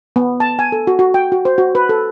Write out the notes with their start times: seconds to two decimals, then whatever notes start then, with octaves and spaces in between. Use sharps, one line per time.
0.16 B3
0.40 A5
0.59 G#5
0.72 A4
0.87 F#4
0.99 F#4
1.14 G5
1.32 F#4
1.45 C5
1.58 F#4
1.75 B4
1.89 A4